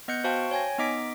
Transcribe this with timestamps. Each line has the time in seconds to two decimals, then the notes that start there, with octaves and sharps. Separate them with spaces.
0.08 B3 D#5 F#6 G6 C#7
0.24 F#4 C5 F5 G5 A5 C#6
0.51 C#5 G5 G#5 G#6 A#6
0.78 B3 D#4 D#5 D6 B6 D7